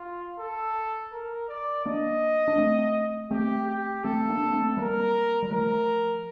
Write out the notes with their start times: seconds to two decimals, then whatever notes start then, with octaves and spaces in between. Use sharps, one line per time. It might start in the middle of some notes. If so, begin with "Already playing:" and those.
Already playing: F4
0.39 A4
1.12 A#4
1.49 D5
1.85 A#3 D4 D#5
2.48 D4
2.58 A3 C4
3.31 A3 C4 G4
3.68 G4
4.04 A3 C4 A4
4.29 A#3 D4
4.46 D4
4.53 A3 C4
4.77 G3 A#3 A#4
5.43 G3
5.51 F3 A3 A#4